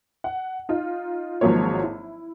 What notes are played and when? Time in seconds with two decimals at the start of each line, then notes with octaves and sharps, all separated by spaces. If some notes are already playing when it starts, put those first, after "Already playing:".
0.24 F#5
0.69 D#4 F4
1.41 G#1 G#2 F3 F#3 A#3 C#5
1.83 E4